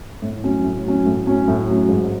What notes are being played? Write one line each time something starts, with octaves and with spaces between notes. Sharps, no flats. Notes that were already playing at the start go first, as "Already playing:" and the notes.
A2
F#3 C#4
A2
F#3 C#4
A2
F#3 C#4
A2
F#3 C#4
G#2